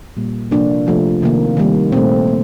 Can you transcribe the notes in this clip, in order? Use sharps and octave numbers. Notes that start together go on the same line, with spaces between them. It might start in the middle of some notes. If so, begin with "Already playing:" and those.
A#2 G3 A#3
C3 F3 A#3 D4
C3 F3 A3
C3 D#3 A#3
D#3 G3 A#3
A#2 A3 C4
A#3